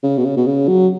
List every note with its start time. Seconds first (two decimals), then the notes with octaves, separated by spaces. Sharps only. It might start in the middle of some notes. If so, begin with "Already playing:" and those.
0.03 C#3
0.18 B2
0.25 C#3
0.37 B2
0.47 C#3
0.68 F#3